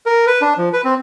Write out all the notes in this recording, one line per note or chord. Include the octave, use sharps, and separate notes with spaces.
A#4
B4
D4
F3
B4
C4